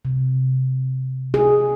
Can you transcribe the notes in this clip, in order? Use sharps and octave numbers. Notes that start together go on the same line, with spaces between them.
C3
G#4